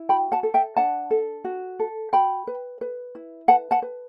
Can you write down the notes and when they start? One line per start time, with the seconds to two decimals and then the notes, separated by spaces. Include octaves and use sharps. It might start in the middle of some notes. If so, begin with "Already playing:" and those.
Already playing: E4
0.09 F#4 G5 B5
0.32 F#5 A5
0.43 A4
0.54 E5 G5
0.77 D4 F#5 A5
1.10 A4
1.44 F#4
1.79 A4
2.13 F#4 G5 B5
2.47 B4
2.81 B4
3.15 E4
3.48 B4 F#5 A5
3.71 F#5 A5
3.82 B4